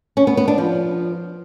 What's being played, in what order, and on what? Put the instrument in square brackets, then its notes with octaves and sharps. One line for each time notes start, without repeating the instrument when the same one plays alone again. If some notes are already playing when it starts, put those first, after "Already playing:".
[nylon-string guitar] C#4
B3
B3
D4
F3